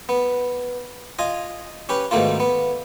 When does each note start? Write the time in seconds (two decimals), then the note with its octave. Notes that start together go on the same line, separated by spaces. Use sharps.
0.09 B3
1.19 F4 D#5 G#5
1.89 C#4 G4 B4
2.11 G#2 B2 D#3 A3 A#3 F4
2.40 B3